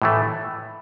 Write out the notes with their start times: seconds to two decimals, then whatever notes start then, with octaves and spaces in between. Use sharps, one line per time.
0.02 A2 E3 A3